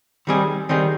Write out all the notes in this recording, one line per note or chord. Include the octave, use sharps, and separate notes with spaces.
D#3 G3 C4 D#4 G#4
D#3 G3 C4 D#4 G#4